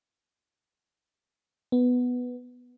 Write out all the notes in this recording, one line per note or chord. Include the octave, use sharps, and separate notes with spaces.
B3